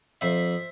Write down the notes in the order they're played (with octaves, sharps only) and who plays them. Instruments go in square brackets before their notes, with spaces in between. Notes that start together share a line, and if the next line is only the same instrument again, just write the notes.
[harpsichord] F2 C5 E5